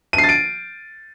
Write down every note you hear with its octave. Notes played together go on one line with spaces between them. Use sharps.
D#7
C7
A6
D7